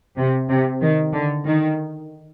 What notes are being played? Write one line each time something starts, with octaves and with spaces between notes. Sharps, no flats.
C3
C3
D#3
D3
D#3